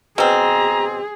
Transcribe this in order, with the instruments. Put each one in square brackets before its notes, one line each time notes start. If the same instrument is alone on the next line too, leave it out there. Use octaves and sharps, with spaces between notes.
[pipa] B2 C4 [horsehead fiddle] G#4 [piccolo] A#5